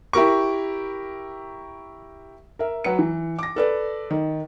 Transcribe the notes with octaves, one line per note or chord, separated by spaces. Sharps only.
E4 G4 A#4 C#6
A#4 E5
F#3 B4 C#7
E3
D6 A#6
A4 B4 D5
D#3